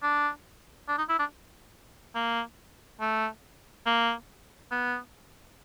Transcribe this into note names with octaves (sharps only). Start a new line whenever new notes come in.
D4
D4
D#4
E4
D4
A#3
A3
A#3
B3